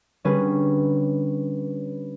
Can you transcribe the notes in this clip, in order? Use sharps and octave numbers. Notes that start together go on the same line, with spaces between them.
D3 G3 C#4 G#4 B4